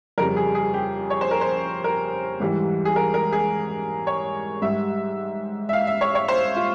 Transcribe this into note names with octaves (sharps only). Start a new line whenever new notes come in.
F2 C#3 G3 A#4
G#4
G#4
G4
C#5
C5
A#4
C5
A#4
G#2 E3 G3
G#4
A#4
A#4
G#4
C#5
G#2 G3 E5
E5
F5
E5
C#5
C#5
C5
F4